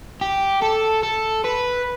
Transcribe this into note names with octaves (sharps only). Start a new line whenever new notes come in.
G4
A4
A4
B4